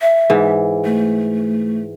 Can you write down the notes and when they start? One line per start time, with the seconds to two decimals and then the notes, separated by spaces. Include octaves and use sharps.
0.01 E5
0.30 G#2 E3
0.85 A3